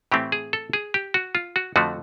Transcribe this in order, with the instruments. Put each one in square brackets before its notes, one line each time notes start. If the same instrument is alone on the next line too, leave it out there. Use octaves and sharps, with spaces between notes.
[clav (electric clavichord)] A2 E3 A3 C4 G4
G#4
A4
G#4
G4
F#4
F4
F#4
F2 D3 F3 A3 F#4